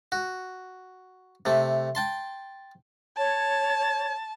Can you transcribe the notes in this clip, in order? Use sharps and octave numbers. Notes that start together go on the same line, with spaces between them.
F#4
C3 A3
G5 A5 C6
C#5 A5